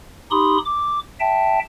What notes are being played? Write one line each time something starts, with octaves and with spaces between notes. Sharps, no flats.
D#4 G4 B5 C6 D#6
D6
E5 G5 A5